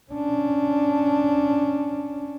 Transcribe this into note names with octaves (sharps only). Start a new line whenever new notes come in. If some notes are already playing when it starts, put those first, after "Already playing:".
C#4 D4